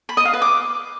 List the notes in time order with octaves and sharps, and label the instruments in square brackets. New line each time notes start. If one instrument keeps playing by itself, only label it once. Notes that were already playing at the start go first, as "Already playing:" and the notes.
[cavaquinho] B5
D#5
F5
B4
D6